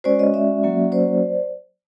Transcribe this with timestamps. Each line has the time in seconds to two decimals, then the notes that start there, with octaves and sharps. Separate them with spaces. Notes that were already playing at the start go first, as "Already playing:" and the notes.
0.04 G#3 C#4 F#4 C5 D5
0.19 C#5 D#5
0.34 D5 E5
0.63 F#3 A#3 C#4 F#4
0.92 C5 D5